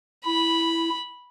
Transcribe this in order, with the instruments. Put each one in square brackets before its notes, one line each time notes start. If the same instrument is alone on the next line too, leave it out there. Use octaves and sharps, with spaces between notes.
[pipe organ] E4 [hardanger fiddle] B5